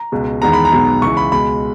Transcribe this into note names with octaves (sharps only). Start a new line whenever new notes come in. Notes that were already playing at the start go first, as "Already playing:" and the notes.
Already playing: A#5
C#2 B2 G#3
E2 D#3 G#3 B3 A#5
B5
A#5
B1 B2 G#3 B3
C#2 C#3 E3 C#6
B5
C#2 B2 G#3 B5